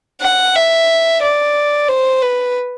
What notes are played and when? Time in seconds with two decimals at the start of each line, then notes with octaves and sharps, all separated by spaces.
0.22 F#5
0.55 E5
1.22 D5
1.88 C5
2.22 B4